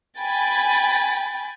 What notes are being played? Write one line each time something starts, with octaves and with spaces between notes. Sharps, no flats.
G5 G#5 B5 A6